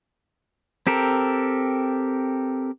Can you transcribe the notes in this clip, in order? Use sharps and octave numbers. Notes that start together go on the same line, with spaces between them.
C4 G4 A4 A#4